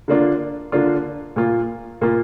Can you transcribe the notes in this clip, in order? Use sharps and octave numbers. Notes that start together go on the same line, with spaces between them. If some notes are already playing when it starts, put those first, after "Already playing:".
D3 A#3 D4 F4
D3 A#3 D4 F4
A#2 A#3 F4
A#2 A#3 F4